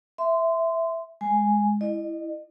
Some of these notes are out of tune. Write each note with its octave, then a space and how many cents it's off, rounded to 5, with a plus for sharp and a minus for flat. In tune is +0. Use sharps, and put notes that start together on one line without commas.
E5 +0 C6 -20
G#3 +0 G#5 +0
E4 +0 D#5 -40